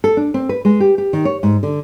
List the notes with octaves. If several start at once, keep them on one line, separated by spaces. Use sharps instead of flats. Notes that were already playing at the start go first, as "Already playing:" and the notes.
A4
D4
C4
B4
G#3
G4
G4
D#3
C#5
G#2
D3